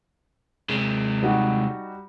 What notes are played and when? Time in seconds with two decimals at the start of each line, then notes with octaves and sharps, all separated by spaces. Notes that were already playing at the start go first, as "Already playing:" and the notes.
0.69 C3 G#3
1.23 G3 D#4 F#4